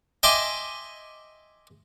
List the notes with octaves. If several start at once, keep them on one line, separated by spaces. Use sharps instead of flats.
D#5 E5 G5 G#5 C6 D6